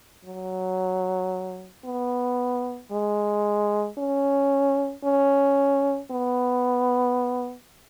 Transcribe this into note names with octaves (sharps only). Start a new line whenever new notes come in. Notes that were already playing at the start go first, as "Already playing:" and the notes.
F#3
B3
G#3
C#4
C#4
B3